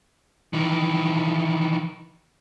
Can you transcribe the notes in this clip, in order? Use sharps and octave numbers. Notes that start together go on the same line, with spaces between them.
D#3 E3